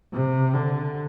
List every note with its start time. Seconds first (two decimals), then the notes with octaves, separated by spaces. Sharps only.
0.13 C3
0.54 D3